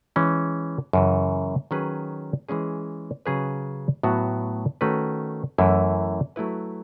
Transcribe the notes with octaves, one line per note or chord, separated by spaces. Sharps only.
E3 G#3 C#4
F#2 C#3 E3
D#3 F#3 C#4 G#4 B4
E3 G#3 C#4 G#4
C#3 F#3 C#4 G#4 B4
A2 F#3 B3 F#4
D#3 A3 C#4 F#4 B4
F#2 E3 A3 E4
F#3 A3 E4 B4